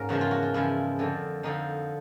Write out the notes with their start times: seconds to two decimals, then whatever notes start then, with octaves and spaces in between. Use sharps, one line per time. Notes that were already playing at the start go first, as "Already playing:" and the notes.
Already playing: G#2 A#3 C#4 A#4
0.09 E2 C#3 F3 G#3 F#4
0.21 F4
0.31 F#4
0.42 F4
0.54 E2 C#3 F3 G#3 E4
0.99 F2 D3 F3
1.43 F2 D3 F3 D#4